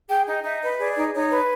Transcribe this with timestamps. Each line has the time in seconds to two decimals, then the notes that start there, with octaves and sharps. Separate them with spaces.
0.09 G#4 G5
0.27 D#4
0.43 D#4 E5
0.61 B4 D#5
0.79 G#4 D5
0.97 D#4
1.14 D#4 C#5
1.30 B4